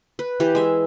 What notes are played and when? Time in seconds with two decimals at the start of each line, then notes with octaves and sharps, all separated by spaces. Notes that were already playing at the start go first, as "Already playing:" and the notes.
0.19 B4
0.40 E3 G4
0.55 G#3 E5